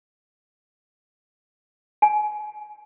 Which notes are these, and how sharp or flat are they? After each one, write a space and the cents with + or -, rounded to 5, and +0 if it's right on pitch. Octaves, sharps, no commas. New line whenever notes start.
G#5 +30